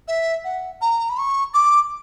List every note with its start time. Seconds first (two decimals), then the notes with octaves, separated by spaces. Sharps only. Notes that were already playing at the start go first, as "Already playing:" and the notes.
0.08 E5
0.44 F#5
0.81 A#5
1.10 B5
1.18 C#6
1.54 D6